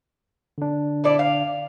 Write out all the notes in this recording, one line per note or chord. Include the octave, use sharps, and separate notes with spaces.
D3 D4
E4 A4 D5
F5